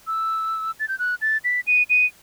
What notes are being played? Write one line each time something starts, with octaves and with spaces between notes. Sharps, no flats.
E6
A6
G6
F#6
A6
B6
D#7
D#7